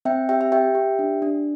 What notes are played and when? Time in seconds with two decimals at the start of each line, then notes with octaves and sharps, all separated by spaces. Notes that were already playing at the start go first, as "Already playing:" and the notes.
0.05 C4 E5 G5
0.29 G4 E5 G5
0.41 E5 G5
0.52 G4 E5 G5
0.75 G4
0.99 D4
1.22 D4